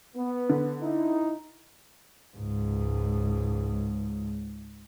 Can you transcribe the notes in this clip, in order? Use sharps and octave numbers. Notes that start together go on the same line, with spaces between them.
B3
D3
D#4 E4
C#2 G#2